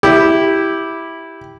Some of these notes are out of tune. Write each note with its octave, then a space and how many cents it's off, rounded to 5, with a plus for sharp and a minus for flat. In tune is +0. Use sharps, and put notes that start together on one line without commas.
E4 -5 G4 +0